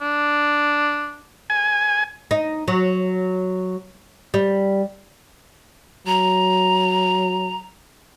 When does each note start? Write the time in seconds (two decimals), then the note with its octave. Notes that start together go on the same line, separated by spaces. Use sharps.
0.01 D4
1.50 G#5
2.31 D#4
2.68 F#3
4.34 G3
6.07 F#3 A#5